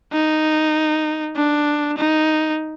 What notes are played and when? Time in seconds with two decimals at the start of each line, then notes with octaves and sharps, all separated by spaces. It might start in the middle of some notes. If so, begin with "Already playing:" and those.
0.13 D#4
1.36 D4
1.97 D#4